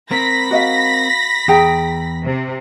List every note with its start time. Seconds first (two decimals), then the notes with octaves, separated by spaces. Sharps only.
0.11 C4 A#4 B5 A#6 B6
0.51 F#4 D#5 F5
1.48 E2 G#4 G5 A#5
2.25 C3